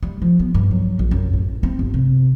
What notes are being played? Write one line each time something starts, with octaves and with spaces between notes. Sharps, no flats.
G3
F3
B3
G2
F#3
A#1
F#2
A1
C4
G1
C3